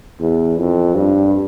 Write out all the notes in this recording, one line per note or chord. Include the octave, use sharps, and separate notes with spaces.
E2
F2
G2